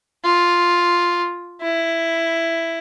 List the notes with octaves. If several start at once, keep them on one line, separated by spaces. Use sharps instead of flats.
F4
E4